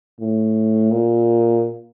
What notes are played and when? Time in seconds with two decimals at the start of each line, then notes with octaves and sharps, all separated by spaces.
0.20 A2
0.92 A#2